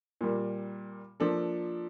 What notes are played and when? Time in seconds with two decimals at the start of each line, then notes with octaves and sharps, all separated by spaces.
0.21 A#2 G3 A#3
1.20 F3 A#3 D4 A4